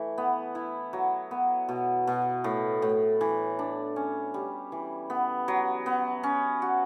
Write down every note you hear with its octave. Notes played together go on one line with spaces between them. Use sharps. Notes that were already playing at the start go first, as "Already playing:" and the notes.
Already playing: E3 A3
B3
E4
F#3
B3
B2
B2
A2
A2
E3
D4
C#4
G3
E3
B3
F#3
B3
C#4
F#4